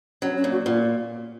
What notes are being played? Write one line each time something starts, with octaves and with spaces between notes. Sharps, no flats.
F#3 C#4
C#4
A#2
F#4
A#2 F4